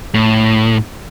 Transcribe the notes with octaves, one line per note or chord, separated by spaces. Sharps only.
A2